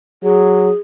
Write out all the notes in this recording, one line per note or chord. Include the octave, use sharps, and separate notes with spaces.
F#3 G#4